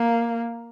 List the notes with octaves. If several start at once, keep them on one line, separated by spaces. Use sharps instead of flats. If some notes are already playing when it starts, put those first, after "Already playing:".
Already playing: A#3